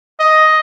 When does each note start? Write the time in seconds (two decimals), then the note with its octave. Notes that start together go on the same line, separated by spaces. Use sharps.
0.20 D#5